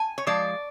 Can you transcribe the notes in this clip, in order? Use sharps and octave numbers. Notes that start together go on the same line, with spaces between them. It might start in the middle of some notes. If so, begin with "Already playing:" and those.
Already playing: G#5
C#5
F3 G#3 D5